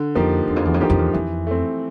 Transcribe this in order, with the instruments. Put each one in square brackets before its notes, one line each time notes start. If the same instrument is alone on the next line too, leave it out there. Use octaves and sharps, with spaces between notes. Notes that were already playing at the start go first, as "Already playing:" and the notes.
Already playing: [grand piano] D3
[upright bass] F2 [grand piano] F3 A#3 D#4 G4
[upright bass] E2 [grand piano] D3
[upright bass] F2
E2
F2
[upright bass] E2 [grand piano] F3 A#3 D#4 G4
[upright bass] F2
E2
[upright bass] F2 [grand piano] E3
[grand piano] A3 C4